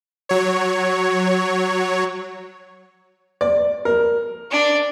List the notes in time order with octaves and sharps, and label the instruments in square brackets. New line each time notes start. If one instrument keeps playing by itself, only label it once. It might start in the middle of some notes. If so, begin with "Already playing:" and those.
[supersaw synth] F#3 C#5
[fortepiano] D5
A#4
[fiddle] D4 D5